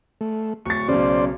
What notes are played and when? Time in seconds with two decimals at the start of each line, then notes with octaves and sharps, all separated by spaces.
0.21 A3
0.66 D1 C#6 A6
0.88 B1 C#3 C5 D5